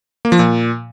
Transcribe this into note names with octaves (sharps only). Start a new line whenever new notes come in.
A#3
F3
A#2